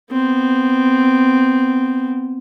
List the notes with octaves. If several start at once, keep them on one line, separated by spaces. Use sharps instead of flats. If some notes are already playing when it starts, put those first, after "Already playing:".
B3 C4